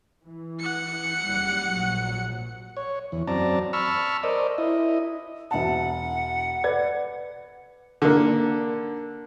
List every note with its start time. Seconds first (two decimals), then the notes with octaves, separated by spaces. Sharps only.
0.24 E3
0.60 F#5 C#7
1.25 F#1 G3
1.67 A#1 A#2 F#3
2.77 C#5
3.12 E2
3.27 F#2 C4 D5 A5 A#5
3.73 A5 B5 C#6 E6 F6
4.23 A#4 C5 D5 D#5
4.58 E4 D#5
5.51 E1 E5 F#5 A5
6.64 B4 D5 G#6
8.02 D3 A#3